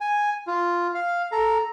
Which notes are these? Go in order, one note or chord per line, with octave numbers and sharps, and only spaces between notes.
G#5
F4
F5
A4 A#5